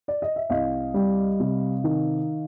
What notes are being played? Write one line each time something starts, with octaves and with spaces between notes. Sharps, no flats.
D5
D#5
E5
C2 D#5 F5
G3
C3
D#3